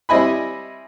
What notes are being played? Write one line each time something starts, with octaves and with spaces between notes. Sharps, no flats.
G3 C4 E4 D#5 G#5 B5